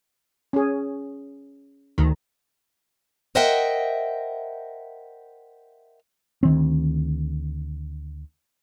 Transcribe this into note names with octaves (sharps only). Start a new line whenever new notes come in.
C#4 G#4
D2 D#3
A#4 C5 D#5 E5 F#5 G5
D2 D#3 C4